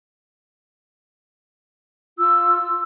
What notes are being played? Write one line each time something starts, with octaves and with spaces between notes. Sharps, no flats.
F4 E6